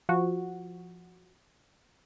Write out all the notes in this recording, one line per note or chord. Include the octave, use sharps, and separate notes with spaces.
F3 F#4